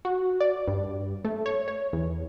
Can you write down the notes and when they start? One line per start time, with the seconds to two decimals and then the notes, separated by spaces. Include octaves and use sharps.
0.05 F#4
0.40 D5
0.68 G2
1.25 A3
1.46 C#5
1.68 C#5
1.93 E2